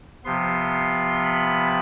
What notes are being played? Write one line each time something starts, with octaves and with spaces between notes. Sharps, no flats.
C3 F3 B3 C6
B5